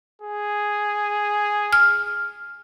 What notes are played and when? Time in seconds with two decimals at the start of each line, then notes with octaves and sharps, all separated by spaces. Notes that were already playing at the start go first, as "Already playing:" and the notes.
0.22 G#4
1.73 F6